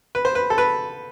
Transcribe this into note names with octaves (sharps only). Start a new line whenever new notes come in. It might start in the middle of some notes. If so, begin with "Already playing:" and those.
B4
C5
B4
A4
B4